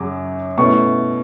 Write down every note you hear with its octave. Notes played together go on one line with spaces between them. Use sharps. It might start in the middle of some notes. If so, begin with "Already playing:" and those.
Already playing: F#2 C#3 F#3 C#4 D6
B2 A3 C#4 E4 C#6